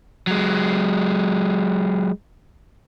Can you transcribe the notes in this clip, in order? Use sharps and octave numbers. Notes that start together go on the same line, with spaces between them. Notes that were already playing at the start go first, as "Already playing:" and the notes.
F#3 G#3